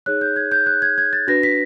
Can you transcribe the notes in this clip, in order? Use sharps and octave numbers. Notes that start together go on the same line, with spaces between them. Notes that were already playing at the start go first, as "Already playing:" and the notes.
D#4 G#4 C#5 F#6
G6
G#6
G6
F#6
G#6
G#6
A6
D4 F#4 B4 A#6
B6